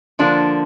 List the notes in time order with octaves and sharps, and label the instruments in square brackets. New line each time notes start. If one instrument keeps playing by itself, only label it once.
[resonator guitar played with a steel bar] D3 F3 A#3 D4